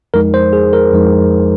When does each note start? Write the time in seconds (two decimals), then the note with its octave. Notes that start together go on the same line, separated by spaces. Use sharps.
0.14 F2 F3 G#3 D#4 A#4
0.34 C5
0.53 G#4
0.73 A#4
0.93 F2 F3 G#3 D#4